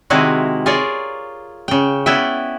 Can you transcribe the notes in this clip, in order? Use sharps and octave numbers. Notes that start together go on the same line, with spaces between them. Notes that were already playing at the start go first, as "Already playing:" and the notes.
C3 D#3 G#3 D#4 E4 F#4
F4 G#4 A#4 C#5 D5
C#3 G5
B3 C#4 E4 D5 E5 G5